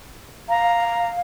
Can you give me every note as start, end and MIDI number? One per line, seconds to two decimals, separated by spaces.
0.49 1.21 77
0.49 1.10 82